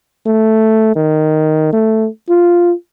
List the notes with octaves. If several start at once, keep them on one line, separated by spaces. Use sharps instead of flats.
A3
D#3
A3
F4